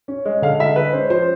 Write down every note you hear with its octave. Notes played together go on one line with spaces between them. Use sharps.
C#4
G#3
D3 F5
G#3 E5
G#3 B4
C#4 C5
F3 C5